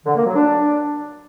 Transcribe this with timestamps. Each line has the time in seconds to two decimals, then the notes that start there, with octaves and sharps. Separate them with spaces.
0.06 D3
0.16 A#3
0.26 F#3
0.36 D4